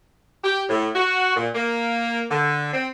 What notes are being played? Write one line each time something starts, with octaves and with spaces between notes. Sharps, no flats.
G4
A2
F#4
A#2
A#3
D3
C4